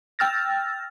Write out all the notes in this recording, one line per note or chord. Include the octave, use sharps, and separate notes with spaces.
G5 E6 F6 A6 A#6